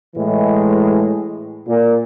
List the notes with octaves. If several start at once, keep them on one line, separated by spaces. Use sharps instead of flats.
A2 E3 G#3
A#2